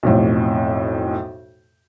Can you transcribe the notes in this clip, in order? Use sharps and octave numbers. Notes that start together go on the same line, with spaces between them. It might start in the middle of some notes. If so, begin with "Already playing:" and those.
B1 F2 A2